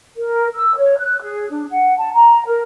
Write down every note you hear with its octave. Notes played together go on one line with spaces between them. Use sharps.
A#4
E6
C#5
F#6
G#4
D4
F#5
A5
A#5
A#4